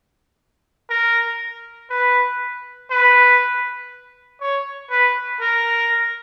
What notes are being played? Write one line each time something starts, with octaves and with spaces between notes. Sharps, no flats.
A#4
B4
B4
C#5
B4
A#4